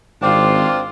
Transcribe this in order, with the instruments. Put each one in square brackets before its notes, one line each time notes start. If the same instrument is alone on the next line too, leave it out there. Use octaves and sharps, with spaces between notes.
[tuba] G#1 [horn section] C4 D4 F4 [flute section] F5 D6